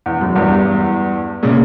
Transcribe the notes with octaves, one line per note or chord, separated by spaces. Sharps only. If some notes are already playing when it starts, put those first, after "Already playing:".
E2
F#2
E2 G2
A#2 C#3